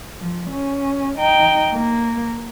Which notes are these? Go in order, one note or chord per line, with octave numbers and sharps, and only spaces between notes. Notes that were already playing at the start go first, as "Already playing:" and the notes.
F3
C#4
D#4 G5
A#3